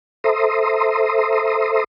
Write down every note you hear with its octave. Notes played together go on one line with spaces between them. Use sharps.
A4 C5 E5 A#5 C6 D#6